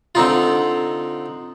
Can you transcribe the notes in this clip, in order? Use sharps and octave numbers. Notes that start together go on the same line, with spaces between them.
D3 C4 D#4 F4